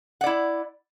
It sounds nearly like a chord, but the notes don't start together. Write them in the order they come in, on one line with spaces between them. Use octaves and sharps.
F#5 D5 E4